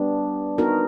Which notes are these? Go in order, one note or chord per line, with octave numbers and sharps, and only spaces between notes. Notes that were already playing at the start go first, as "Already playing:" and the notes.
Already playing: G3 B3 D4
B3 D#4 F#4 A#4